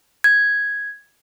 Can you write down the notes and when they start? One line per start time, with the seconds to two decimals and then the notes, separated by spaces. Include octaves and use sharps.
0.24 G#6